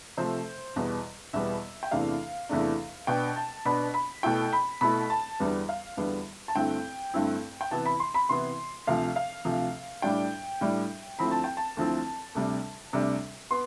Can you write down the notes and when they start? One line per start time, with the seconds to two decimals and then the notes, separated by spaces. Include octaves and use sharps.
0.17 C3 F3 A3 C5
0.76 E2 B2 G3 B3
1.33 E2 B2 G3 B3 E5
1.83 G5
1.91 E2 C3 E3 A3 D4 F5
2.49 E2 C3 E3 A3 D4
3.07 B2 B3 D4 G5
3.36 A5
3.65 B2 B3 D4 B5
3.94 B5
4.23 B2 A3 E4 G5
4.53 B5
4.81 B2 A3 E4 B5
5.10 A5
5.40 E2 D3 G3 B3
5.69 F5
5.97 E2 D3 G3 B3
6.48 A5
6.55 G2 D3 A3 C4 E4 G5
7.14 G2 D3 A3 C4 E4
7.61 G5
7.71 C3 E3 B3 E4 A5
7.86 B5
8.00 C6
8.14 B5
8.29 C3 E3 B3 E4 C6
8.87 D2 C3 F3 F5
9.16 F5
9.45 D2 C3 F3
10.02 A2 G3 D4 G5
10.61 A2 G3 D4
11.19 D2 D3 F3 C4 E4 B5
11.31 A5
11.44 G5
11.57 A5
11.77 D2 D3 F3 C4 E4
12.35 D2 C3 G3 D4
12.93 D2 C3 G3 D4
13.51 B3 C6